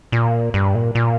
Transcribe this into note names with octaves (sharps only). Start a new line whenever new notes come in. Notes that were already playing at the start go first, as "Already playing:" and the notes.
A#2
G2
A#2
A#2